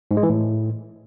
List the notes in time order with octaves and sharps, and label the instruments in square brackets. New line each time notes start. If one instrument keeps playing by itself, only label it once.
[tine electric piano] G#2
G#3
E3
A2